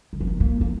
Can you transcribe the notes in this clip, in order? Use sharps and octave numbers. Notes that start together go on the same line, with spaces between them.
D#3
E3
D#3
A#3
A#3